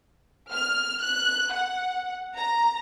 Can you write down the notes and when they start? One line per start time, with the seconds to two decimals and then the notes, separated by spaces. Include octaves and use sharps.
0.52 F6
1.01 F#6
1.52 F#5
2.37 A#5